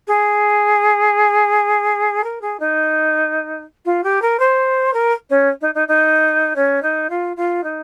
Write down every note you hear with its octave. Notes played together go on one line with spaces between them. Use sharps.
G#4
A#4
G#4
D#4
F4
G4
A#4
C5
A#4
C#4
D#4
D#4
D#4
C#4
D#4
F4
F4
D#4